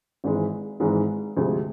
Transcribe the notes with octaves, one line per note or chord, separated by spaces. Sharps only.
G#1 G#2 E3 G#3
G#1 G#2 E3 G#3
D2 C3 F3 G#3